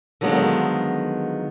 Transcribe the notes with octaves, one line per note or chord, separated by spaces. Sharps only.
D3 D#3 F3 F#3 G#3 B3